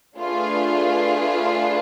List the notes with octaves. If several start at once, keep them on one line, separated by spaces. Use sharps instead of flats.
A3 D4 F4 G#4 B4